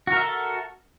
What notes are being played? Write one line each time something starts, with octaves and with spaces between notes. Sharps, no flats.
F#4 A4 A#4 E5